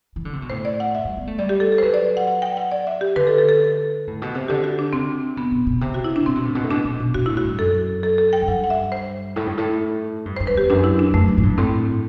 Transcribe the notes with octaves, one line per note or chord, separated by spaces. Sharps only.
E3
D3
C3
B2
A2 C5
D5
F#5
E5
G3
B3
A3
G3 D5
G4
A4
A4
C5
F#3 B4
D5
F#5
F#5
G5
F#5
D5
E5
G4
D3 B4
A4
A4
A4
A2
B2
C3
D3 G4
F#4
D4
C3 C4
B2 B3
B2
B2
C3
F#4
E4
D4
C3 C4
B2
A2
B2
A2
B2 D4
B2
B2
B2 F#4
A2 E4
F#4
G2
F#2 A4
A4
A4
G5
F#2
G2 F#5
F#5
E5
C5
A2
G2
A2
G2
G2 C5
B4
E2 G4
F#2 D4
E4
D4
E2
F#2 A3
F#2
A2
G2
A2 C4